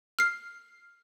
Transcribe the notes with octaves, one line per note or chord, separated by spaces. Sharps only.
F6 C7